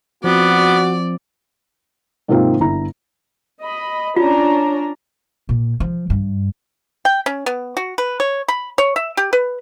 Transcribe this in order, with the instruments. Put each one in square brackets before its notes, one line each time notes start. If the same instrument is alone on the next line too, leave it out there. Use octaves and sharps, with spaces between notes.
[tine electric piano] F3 C4 [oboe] B3 [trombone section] F#4 [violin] D5
[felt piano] G#2 C3 D#3 A#3 C4 F4
G1 D3 E4 A#5
[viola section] D#5 B5
[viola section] C#4 D4 A#5 [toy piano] F4
[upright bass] A#2
F3
G2
[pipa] G5
C#4
B3
F#4
B4
C#5
B5
C#5
E5
G4
B4